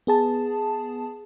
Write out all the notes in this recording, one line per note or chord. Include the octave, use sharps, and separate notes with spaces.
B3 G#4 A5